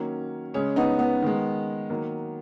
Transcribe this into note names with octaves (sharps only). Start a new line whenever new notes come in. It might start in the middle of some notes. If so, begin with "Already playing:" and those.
Already playing: D#3 F#3 A#3 C#4
C#3 G#3 C#4
B3 D#4
B3
D#3 G#3
D#3 F#3 A#3